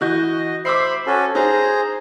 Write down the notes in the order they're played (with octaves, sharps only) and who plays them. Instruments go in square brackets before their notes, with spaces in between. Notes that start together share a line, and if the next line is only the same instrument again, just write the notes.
[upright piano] E3 F#4 G6 [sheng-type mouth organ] D#5
[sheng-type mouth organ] C5 E5 B5 [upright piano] D6 E6 C7
[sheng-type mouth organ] C#4 F#4 A4
[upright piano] D#4 [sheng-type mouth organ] G#4 C5 A#5